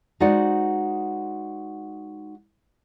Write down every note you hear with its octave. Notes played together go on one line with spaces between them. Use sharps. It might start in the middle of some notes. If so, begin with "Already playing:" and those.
G#3 D#4 F#4 C5 D5 F#5